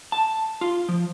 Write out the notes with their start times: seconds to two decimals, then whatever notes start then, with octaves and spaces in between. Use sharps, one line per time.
0.12 A5
0.61 F4
0.89 F3